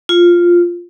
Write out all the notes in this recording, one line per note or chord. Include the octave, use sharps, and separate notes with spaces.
F4